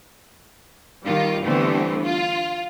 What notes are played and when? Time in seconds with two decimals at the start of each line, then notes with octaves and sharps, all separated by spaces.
1.05 D#3 G3 F4
1.45 D3 E3 G3 A3 B3 C4
2.04 F4